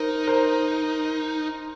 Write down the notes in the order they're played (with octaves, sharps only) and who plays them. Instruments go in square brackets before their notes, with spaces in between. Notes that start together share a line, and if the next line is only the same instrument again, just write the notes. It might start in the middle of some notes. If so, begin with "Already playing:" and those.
Already playing: [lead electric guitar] D#4 [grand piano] A#4 C5
[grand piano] A#4 C5